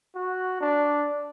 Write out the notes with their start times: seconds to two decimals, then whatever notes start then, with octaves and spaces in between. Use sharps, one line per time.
0.16 F#4
0.61 D4